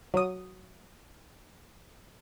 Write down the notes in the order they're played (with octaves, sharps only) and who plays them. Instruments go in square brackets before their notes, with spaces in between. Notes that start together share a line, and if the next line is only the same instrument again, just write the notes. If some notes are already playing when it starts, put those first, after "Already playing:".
[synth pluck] F#3 D#6